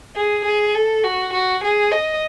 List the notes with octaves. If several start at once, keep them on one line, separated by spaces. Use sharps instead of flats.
G#4
G#4
A4
F#4
F#4
G#4
D#5